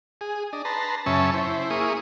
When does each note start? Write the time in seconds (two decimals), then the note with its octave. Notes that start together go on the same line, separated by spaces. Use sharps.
0.21 G#4
0.53 D4 D#5
0.65 B4 A5 A#5 C6
1.06 F#2 C#3 C#4 E5 A5 C#6
1.33 E4 C5
1.70 A#3 E4 G#4 C#6 D#6